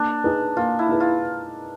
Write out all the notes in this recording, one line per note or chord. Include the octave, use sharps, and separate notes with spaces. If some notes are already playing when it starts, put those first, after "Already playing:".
Already playing: A#3 D4
D#4 G#4 B4
A#3 F4
E4
D#4 G#4 B4
F4